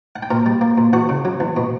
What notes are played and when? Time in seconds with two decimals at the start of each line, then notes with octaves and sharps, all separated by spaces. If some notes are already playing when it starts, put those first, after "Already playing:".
0.16 F#5
0.23 G5
0.30 A#2 A#4 A#5
0.46 G3
0.61 A#3
0.78 A#2
0.93 E2 F#4 F#5
1.09 C#3
1.25 F#3
1.40 E2
1.57 B2